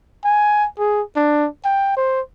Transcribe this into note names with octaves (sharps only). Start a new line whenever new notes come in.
G#5
G#4
D4
G5
C5